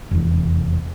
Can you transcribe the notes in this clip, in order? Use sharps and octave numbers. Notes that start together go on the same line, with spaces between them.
F1 E2